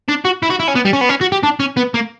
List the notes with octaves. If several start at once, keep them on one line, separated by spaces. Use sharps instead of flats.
D4
F#4
E4
F#4
E4
C#4
B3
G3
C#4
B3
C#4
F#4
G4
D4
C#4
B3
A#3